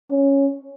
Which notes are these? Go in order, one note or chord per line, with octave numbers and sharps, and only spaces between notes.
C#4